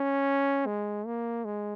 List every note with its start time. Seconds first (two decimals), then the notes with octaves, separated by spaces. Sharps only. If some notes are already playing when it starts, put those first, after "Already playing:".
Already playing: C#4
0.66 G#3
1.06 A#3
1.45 G#3